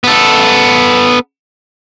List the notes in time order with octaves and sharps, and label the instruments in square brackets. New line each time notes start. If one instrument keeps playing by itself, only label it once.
[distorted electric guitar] B3 A4